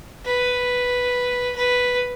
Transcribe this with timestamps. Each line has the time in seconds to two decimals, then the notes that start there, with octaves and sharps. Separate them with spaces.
0.25 B4
1.56 B4